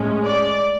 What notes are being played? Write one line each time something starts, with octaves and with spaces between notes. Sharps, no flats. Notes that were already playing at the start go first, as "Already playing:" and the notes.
Already playing: A2 G#3 C#4
D5